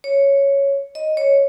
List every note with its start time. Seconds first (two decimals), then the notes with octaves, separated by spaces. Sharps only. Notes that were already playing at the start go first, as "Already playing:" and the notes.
0.04 C#5
0.95 D#5
1.17 C#5